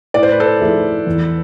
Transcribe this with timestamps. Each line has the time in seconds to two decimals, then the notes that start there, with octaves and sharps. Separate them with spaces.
0.14 A2 D5
0.23 C5
0.32 B4
0.40 A4 C5
0.60 F3 A3 E4 G#4
1.07 E2